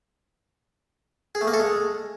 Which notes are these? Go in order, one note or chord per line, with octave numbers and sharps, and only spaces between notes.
G#4
A3
A#3
A4
G#3